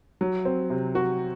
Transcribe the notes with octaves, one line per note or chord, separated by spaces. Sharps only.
F#3
C4
C3
F#4